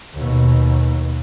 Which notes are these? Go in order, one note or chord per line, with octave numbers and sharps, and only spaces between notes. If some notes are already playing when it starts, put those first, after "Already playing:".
D#2 B2